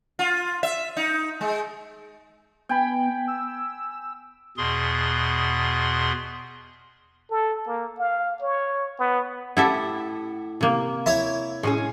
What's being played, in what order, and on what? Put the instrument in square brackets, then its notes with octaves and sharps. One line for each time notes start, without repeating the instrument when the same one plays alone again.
[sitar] F4
E5
D#4
G#3
[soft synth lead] B3 [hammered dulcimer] G5 G#5 B5
[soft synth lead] E6
[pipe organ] E2 B2 G#4 C6
[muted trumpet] A4
A#3
F5
C#5
B3
[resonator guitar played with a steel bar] A2 G4 F#5 [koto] E4 A4 E5
[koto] C3 A#3
[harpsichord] E4 C#5
[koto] A2 [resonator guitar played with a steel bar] G#3 C#4 G#4